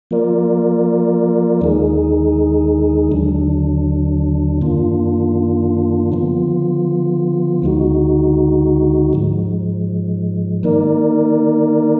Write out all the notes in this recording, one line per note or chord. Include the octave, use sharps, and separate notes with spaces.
F3 A#3 F4 A#4 D5
D#2 D#3 G#3 D#4 G#4
D#2 D3 F#3 D4
F#2 D#3 A#3 D4 F4
D3 F3 B3 F4
D2 D3 G#3 D#4 F#4
G#2 F3 G#3
D#3 A#3 D#4 A#4 D5